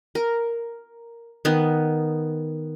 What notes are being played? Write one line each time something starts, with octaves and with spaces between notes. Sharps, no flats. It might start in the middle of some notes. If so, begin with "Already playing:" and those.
A#4
D#3 B3